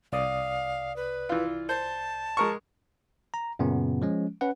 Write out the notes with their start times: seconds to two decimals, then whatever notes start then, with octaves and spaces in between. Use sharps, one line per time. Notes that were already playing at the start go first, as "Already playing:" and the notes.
0.12 C2 D5 F5 D#6
0.96 B4
1.29 E3 F4
1.69 C5 A5
2.37 G#3 A#4 C#6
3.34 A#5
3.59 F#2 A#2 C#3 B3
4.02 F3 G#3 C#4
4.41 C#4 B4 F#5